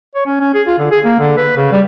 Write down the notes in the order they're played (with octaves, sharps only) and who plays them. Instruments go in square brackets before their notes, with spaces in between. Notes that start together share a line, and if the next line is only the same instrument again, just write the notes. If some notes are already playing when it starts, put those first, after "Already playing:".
[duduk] C#5
C#4
C#4
G#4
F4
D3
G#4
A#3
D3
B4
C#3
G3